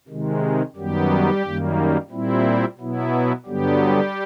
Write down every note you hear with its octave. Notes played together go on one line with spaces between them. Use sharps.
C3 D#3 G#3
F#2 D#3 F#3 G3 B3 G4
F#2 D#3 G3 A#3
A#2 G3 C4 E4
B2 F#3 B3 E4
G2 D3 F#3 G3 B3 G4